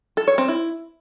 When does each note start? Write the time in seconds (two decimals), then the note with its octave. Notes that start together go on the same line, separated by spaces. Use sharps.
0.17 A4
0.28 C#5
0.38 C4
0.48 E4